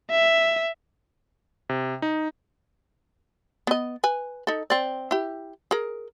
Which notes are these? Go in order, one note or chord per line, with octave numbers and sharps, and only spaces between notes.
E5
C3
D#4
B3 D#5
B4 G#5
D#4 A4
C4 D5
E4 G4
G#4 A#4